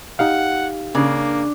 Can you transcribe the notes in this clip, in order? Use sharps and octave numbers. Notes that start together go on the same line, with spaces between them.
D#4 G4 F5 F#5
C#3 A#3 D4